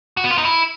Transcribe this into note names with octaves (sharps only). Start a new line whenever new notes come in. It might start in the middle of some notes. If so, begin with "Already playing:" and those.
F#4
B3
F4
D#4
E4